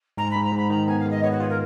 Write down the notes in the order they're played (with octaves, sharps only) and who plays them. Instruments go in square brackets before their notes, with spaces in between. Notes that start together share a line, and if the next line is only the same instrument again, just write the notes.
[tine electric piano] G#2 [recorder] A#5
[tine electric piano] G#2 [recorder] B5
[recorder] A#5
[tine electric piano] G#2 [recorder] B5
[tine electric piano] D#3 [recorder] A#5
[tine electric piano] B3 [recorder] G#5
[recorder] F5
[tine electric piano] G#3
[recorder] D#5
[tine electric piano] B3 [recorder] C#5
[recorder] F#4
[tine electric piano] F4 [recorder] G#4
[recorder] A#4